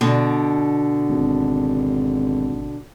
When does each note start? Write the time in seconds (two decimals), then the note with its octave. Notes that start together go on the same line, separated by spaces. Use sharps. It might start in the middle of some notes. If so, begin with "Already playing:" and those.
0.01 B2 D3
1.10 G#1